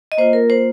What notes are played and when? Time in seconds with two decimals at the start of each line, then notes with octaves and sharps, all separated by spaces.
0.12 D#5
0.18 A#3 F4 C5
0.33 A#4
0.50 C5